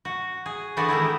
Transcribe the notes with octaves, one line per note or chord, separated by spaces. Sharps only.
F#4
G#4
E3 A3 B3 D4 F#4
D#3 G#3 A3 E4